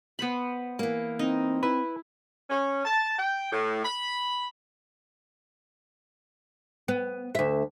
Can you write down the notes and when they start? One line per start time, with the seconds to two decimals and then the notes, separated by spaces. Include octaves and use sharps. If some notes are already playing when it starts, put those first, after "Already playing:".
0.19 B3 C5 B5
0.79 E3 A#3
1.19 C4 D#4
1.63 E4 B4
2.50 C#4
2.85 A5
3.19 G5
3.52 A2
3.84 B5
6.88 B3
7.35 D2 E5